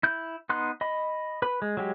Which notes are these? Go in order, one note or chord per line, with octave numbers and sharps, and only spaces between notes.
E4 G6
B3 D#4 C6 F#6
D#5 B5
B4 B5
G#3
F#3 G#3 G4